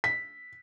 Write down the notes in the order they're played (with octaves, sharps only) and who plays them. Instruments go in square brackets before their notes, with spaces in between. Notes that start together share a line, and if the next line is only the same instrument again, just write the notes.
[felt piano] B6